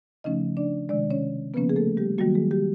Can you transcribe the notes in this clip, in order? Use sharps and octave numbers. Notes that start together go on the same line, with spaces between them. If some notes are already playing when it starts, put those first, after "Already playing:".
C#3 F3 A3 C#4 D#4 D#5
D4 D5
C3 D#3 G#3 D4 D5
C#4 C#5
C#3 F3 A#3 B3 C#4 B4
G#4
A3 A4
G3 G4
D#3 F#3 G3 A#3 F#4
G#3 G#4
G3 G4